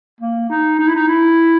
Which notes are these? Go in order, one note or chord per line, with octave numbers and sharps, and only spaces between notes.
A#3
D#4
D#4
E4
D#4
E4